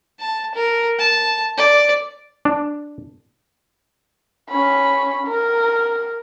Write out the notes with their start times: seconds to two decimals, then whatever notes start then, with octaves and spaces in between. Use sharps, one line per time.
0.20 A5
0.55 A#4
0.99 A5
1.58 D5
2.45 D4
4.50 C#4 B5
5.27 A#4